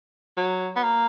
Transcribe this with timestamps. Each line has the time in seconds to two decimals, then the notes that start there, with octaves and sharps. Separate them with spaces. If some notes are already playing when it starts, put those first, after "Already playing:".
0.37 F#3
0.76 B3
0.83 A#3